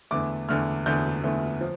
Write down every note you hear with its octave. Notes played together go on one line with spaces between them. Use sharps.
E2 D3 A3 D6
E2 D3 A3 F6
E2 D3 A3 G6
E2 D3 A3
F3